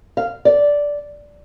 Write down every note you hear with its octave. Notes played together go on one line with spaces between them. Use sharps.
F5
D5